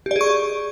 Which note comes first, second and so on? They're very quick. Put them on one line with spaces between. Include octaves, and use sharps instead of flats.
G4 D5 G#4 C#6